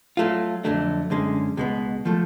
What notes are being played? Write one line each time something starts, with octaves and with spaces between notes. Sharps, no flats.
F#3 A3 F4
F2 D3 F#3 A3 D4
F#2 D3 G#3 C#4
C#2 B2 G#3 B3
F3 A3